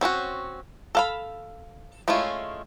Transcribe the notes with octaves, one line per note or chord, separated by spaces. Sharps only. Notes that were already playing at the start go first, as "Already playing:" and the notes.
C4 C#4 E4 F#4
A4 F5 B5
G#3 A3 C#4 E4 F4